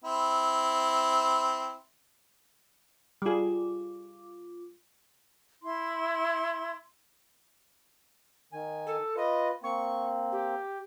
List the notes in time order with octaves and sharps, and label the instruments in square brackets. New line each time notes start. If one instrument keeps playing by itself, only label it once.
[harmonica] C4 E4
[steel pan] G3 G#4 [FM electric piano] F4 D6
[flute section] E4 C6
[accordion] D#3 G#5
[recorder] A4
[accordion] F4 B4 [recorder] D#5
[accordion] A#3 C4 [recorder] C#6
[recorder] G4